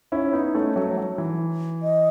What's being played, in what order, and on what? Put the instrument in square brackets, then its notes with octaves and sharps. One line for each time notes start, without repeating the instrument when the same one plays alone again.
[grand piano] C#4 E4
B3 D#4
A3 C#4
F#3 A3
F#3
E3
[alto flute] D#5